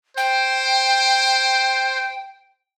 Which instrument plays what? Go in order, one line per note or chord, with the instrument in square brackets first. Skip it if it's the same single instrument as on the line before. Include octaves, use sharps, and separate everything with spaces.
[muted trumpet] C5 [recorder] G5